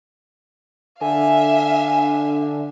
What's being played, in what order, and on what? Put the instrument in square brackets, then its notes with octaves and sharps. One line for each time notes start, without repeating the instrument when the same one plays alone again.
[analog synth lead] D3 [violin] E5 F5 [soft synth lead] G#5